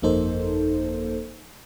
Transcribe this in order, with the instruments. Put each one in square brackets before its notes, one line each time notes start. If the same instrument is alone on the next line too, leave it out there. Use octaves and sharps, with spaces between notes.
[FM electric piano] G1 F2 A#3 D#4 A4 C5